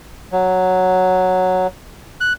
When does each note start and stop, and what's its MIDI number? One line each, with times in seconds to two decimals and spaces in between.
0.32 1.67 54
2.21 2.33 90